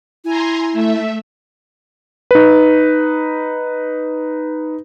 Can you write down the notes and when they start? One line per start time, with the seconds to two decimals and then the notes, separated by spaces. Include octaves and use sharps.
0.24 E4 G#5 A#5 C6
0.72 A3 E5
2.31 D#4 B4